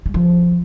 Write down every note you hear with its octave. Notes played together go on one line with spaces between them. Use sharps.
G3
F3